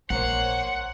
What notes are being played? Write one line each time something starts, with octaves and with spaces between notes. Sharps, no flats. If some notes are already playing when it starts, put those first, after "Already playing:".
A#1 A#3 C5 C#5 F#5